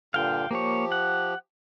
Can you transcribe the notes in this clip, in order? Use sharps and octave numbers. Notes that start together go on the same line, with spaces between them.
G2 A#2 D3 F5 G5
F3 A#3 G4 C#5
F#5